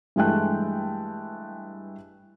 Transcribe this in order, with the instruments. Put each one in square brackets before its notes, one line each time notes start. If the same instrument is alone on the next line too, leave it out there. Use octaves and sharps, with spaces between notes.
[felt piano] G2 E3 G#3 A3 G5 F#6